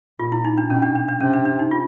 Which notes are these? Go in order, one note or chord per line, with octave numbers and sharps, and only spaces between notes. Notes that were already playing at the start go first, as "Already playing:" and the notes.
A#2 F4
E4
D#4
D4
B2 C#4
D4
D4
D4
C3 C#4
D4
D4
D#4
F4